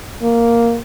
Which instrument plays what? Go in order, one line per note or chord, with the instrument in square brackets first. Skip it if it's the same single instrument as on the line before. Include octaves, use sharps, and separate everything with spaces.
[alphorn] A#3